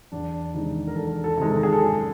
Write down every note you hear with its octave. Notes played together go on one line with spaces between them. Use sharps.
E2 D4
C3 D#3 G#3 D#4
A#4
E2 A4
A4
C3 D#3 G#3
A4
G#4
A4
F#2